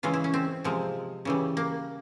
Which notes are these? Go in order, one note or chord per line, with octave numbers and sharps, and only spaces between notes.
C#3 E3 G#3 F4
E4
C#4
C4
C3 F3 G#3
C#3 E3 G3
A#3